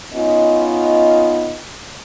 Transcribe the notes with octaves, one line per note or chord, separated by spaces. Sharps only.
B3 C#4 D#4 F4 D#5